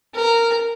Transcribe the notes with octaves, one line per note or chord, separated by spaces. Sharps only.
A#4